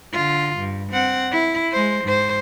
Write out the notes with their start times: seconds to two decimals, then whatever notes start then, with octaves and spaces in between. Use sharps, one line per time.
0.13 D3 F4
0.58 G2
0.92 C4 F#5
1.31 E4
1.72 G#3 C5
2.04 G#2 C5